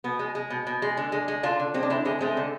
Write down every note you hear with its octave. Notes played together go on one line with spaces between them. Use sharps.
B2 B3
G#3
G#3
B2
B2
G#3
D3
G#3
G#3
D3 D4 F4
D3
G#3 C4
D4
D3 C4 E4
G#3 C4 E4
G#3 A3 C4
D3